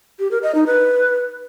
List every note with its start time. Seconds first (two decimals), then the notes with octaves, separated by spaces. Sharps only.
0.19 G4
0.31 A#4
0.43 D#5
0.55 D#4
0.67 B4